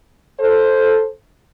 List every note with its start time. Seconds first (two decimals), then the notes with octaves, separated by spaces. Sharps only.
0.39 A4 C5